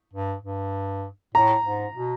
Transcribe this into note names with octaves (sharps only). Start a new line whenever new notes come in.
G2
G2
A2 A#5
G#2
B2